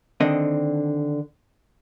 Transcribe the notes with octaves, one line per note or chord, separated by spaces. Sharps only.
D3 D#3 C4 D4 D#5